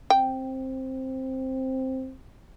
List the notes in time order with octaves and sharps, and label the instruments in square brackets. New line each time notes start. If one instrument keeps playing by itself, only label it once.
[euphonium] C4 [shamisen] G5